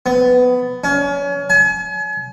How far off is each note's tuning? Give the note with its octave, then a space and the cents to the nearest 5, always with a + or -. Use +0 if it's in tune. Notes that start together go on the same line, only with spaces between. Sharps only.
B3 +15
C#4 +30
G#5 +40